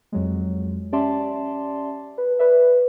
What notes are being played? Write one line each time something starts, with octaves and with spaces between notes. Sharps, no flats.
F2 F#3 G#3
C#4 G4 D5 E5 A5 C6
B4
B4 D5 E5